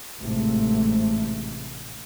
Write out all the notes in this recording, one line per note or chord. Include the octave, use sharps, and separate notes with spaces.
A1 G#2 C3 A3